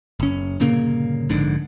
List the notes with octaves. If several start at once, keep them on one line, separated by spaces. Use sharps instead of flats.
F#1 C#4
G1 A#2 C#3 A#3
A#1 G#2 D3 D4